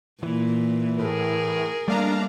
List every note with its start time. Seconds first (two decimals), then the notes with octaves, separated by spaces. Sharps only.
0.23 A#2 E3
0.99 A2 G#4 A#4
1.88 G3 A3 A#3 D4 F5 A#5